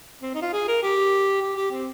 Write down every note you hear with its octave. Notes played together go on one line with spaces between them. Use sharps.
C4
D#4
F4
G#4
A#4
G4
G4
G4
C4